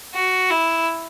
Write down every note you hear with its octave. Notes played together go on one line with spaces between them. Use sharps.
F#4
E4